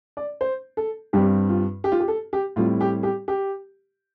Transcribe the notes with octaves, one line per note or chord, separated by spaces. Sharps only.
D5
C5
A4
G2 G3 C4 G4
F4
G4
F4
G4
A4
G4
A2 G3 C4 F4
G4
G4
G4